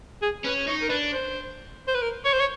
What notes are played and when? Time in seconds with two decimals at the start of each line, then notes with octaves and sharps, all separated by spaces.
0.22 G#4
0.44 C#4 B4
0.67 D#4 C#5
0.82 A#4
0.89 D4 B4
1.13 C5
1.88 C5
1.95 B4
2.02 A#4
2.25 C#5
2.33 C5
2.40 C#5